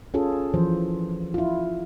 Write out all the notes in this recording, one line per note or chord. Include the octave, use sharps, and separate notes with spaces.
C#4 F4 G#4 A4
E3 F3 C5
E4 F4